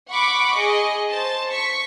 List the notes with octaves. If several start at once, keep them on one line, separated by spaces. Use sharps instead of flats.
F#5 B5 C#6 D6
G#4 D#5
C5 A5
C#6 B6